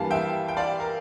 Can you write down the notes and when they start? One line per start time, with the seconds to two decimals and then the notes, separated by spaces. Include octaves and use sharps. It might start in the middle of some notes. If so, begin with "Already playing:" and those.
Already playing: G2 E3 G3 A#3 F5 A5
0.11 E5 G5
0.48 G5
0.56 D5 F5
0.80 A#4